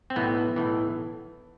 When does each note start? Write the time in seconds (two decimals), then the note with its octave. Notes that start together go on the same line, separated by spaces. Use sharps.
0.10 C4
0.16 B1 A2 E3 B3
0.56 B1 A2 E3